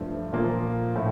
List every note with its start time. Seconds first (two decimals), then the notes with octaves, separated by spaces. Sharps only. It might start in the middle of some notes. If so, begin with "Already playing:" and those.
Already playing: G2 F3 A3
0.32 A#2 F3 A#3 F4
0.95 A2 F3 A3 E4